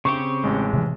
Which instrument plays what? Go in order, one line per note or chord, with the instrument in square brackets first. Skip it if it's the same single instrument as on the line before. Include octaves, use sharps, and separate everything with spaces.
[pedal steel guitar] C#3 C4 G4 [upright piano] C#6
[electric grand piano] A1 G#3
[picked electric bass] C3 E3